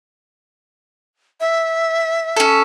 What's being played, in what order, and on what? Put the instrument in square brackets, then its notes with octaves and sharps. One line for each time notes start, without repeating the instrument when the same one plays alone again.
[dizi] E5
[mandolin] C#4 A4